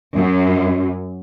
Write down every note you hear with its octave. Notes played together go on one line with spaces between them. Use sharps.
F#2